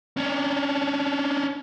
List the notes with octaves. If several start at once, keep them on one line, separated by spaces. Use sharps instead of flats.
C#4 D4